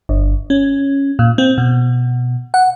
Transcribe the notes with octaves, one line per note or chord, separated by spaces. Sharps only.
G1
C#4
A#2
C4
B2
F#5